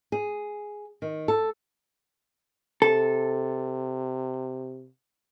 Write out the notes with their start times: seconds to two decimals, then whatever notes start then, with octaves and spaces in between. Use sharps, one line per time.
0.12 G#4
1.02 D#3
1.28 A4
2.82 C3 A4